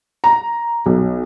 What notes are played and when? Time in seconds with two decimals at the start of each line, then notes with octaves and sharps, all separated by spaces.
0.24 A#5
0.86 B1